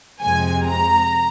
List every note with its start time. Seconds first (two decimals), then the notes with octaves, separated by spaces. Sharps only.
0.22 F2 C3 F3 G#3 C4 G#5
0.66 A#5